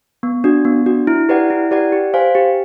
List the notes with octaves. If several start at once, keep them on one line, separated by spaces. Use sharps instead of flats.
B3
D4 F#4
B3
D4 F#4
E4
G4 B4 D5 F#5
E4
G4 B4 D5 F#5
G4
C5 F5 G#5
G4